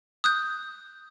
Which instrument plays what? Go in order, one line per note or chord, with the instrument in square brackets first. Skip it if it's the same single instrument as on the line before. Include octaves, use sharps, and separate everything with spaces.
[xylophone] D#6 F#6 G6